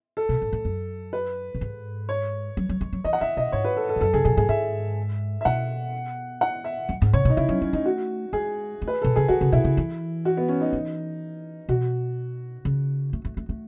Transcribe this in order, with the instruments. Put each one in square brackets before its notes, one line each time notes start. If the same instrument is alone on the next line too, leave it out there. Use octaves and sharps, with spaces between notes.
[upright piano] A4
[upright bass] B2
A2
A2
F#2
[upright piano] B4
[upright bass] A2
G#2
[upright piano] C#5
[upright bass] F#3
F#3
G#3
F#3
[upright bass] E3 [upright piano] D#5
[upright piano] F#5
[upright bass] D#3 [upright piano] E5
[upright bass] B2 [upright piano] D#5
[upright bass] G#2 [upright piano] C#5
[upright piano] B4
A4
A4
[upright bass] G#2
[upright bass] F#2 [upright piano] A4
[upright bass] C#3 [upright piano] G#4
[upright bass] B2 [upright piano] G#4
[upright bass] A2 [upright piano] G#4
[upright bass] G#2 [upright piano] E5
[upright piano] E5
[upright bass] B2 [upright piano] F#5
[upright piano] F#5
E5
[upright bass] F#2
G#2
[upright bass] C#3 [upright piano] C#5
[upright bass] B2 [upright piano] D#4
[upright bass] C#3 [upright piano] E4
[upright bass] F#3 [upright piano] C#4
[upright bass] F#3 [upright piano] C#4
[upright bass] A3 [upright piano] D#4
[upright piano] F#4
[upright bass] G#3 [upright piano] G#4
[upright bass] A3
[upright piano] B4
[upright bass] B2 [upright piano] A4
[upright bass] C#3 [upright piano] G#4
[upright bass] D#3 [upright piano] F#4
[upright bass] C#3
[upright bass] B2 [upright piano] E4
[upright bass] C#3
E3
[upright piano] F#4
B3
C#4
D#4
[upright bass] E3
[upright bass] B2 [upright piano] F#4
[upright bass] C#3
A3
A3
A3
A3